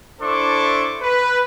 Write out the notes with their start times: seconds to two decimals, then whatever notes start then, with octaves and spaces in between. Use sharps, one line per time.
0.21 D4 E4 A4 C5 C#6 D6
1.01 B4